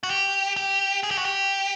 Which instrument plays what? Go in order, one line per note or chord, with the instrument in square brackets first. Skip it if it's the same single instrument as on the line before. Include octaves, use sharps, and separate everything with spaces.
[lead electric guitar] F#4
G4
G4
G#4
G4
F#4
G4